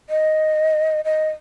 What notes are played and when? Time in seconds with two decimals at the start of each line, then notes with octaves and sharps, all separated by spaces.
0.10 D#5
1.05 D#5